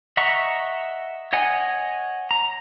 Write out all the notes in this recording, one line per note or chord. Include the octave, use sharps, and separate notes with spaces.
D#5 E5 F#5 A#5 C#6
C#5 D#5 F#5 G#5
A#5